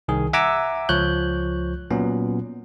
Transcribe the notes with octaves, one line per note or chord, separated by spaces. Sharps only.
C2 D#3 G#4
E5 F#5 G#5 A#5 D6 E6
C#2 F3 C#5 F#6 G6
A#2 F#3 B3 C#4